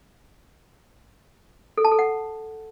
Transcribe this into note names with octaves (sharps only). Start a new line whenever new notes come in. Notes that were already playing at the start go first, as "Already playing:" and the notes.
A4
A5
A4
F#5